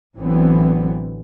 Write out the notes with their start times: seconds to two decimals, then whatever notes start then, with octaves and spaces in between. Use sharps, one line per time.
0.18 A1 D3 E3 F#3 B3 C4